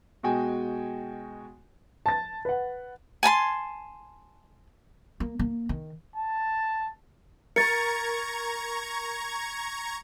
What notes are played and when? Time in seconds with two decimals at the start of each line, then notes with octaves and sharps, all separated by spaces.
0.23 B2 G#3 F#4 G5 G#5
2.06 A5 A6
2.45 B4 F#5
3.23 G#5 A5 B5 C6
5.20 A#3
5.39 A#3
5.69 D#3
6.16 A5
7.56 A#4 A#5 C#6 G#6 A6 C#7